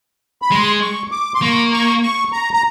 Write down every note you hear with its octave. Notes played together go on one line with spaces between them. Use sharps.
B5
G#3 C6
C#6
D6
C6
A#3 C#6
C#6
C#6
A#5
A#5